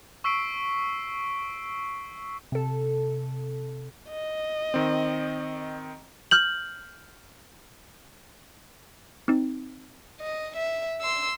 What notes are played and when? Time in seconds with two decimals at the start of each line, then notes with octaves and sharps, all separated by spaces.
0.24 C#6 E6 B6 C7 D7
2.52 C3 A4
4.10 D#5
4.74 D#3 C4
6.31 F6 G6 F#7
9.28 C4 D#4
10.21 D#5
10.56 E5
11.01 C6 E6